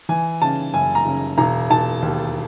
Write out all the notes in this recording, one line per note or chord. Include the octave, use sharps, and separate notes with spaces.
E3 G#5
C#3 A5
F#1 G#5
A#5
C#3
E1 A#5
E1 A5
D#2